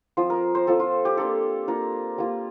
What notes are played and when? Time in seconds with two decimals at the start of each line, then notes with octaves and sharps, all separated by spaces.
0.17 F3 C4 F4 C5
0.30 A#4
0.55 C5
0.67 F3 C4 F4 A4
0.80 F4
1.05 G4
1.17 A#3 D4 F4 A4
1.68 A#3 D4 F4 A#4
2.18 G3 A#3 F4